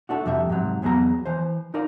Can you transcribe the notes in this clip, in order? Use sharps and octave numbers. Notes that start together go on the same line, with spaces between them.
A3 D4 F#4
F2 C3 G3 E5
G#2 C3 F#3
E2 F#3 B3 G#4 A#5
E3 C5
D#4 F4 A#4 D5